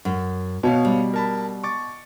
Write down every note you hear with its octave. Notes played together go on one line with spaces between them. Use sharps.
F#2
B2 B3 C#5 F5
G3
A#4 A5 B5
C#6 D6 A6